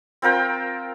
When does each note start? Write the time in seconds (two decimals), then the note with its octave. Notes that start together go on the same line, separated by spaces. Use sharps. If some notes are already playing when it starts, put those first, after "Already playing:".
0.22 C4 F4 A#4 G5